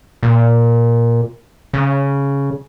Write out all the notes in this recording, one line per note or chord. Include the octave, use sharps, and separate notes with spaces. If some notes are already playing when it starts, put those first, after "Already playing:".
A#2
C#3